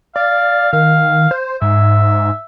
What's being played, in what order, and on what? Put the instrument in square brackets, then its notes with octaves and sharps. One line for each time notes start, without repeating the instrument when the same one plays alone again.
[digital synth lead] D5 [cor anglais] F5
[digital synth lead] D#3 [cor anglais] F5
[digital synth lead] C5
[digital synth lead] G#2 [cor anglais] E5